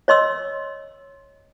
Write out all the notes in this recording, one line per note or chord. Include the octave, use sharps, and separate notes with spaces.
C#5 D#5 C6 E6